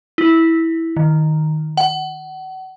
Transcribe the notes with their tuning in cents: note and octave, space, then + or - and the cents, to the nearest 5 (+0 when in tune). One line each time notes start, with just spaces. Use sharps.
E4 -10
D#3 -5
F#5 +30